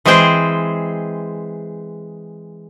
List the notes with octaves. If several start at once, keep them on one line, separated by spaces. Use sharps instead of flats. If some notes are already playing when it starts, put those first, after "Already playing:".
E3 G#3 C4 G#4 C5 G5